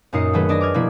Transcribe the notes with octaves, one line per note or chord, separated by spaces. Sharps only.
F#2 A#2 D#4 D#6 C7 C#7
D#3 F#3 A3 G#4 A4 B4
D4 D5 D#5 G#5 A#6
D6 F6 G#6
B2 F3 A#3 E4